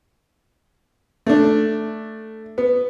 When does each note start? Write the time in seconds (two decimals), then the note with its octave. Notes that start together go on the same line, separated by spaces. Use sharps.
1.26 A3 D4
2.58 B3